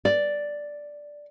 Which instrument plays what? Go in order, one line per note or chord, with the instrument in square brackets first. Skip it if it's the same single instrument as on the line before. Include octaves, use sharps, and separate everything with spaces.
[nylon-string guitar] D5